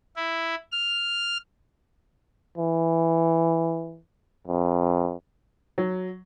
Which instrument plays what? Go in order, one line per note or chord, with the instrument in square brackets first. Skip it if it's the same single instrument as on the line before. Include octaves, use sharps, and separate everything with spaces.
[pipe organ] E4
F6
[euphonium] E3
F2
[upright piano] F#3